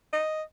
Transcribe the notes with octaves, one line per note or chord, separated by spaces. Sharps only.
D#5